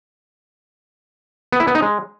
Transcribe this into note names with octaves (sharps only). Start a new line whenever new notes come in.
B3
E4
B3
D#4
G#3